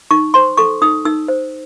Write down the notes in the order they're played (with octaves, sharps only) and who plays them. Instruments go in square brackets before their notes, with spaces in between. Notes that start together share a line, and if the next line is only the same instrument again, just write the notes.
[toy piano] D#4 C#6
C5 C6
A4 C#6
D#4 D#6
D#4 E6
C5